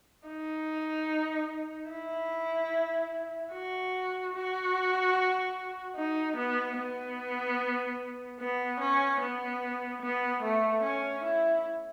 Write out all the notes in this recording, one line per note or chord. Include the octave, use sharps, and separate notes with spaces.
D#4
E4
F#4
F#4
D#4
B3
B3
B3
C#4
B3
B3
A3
C#4
E4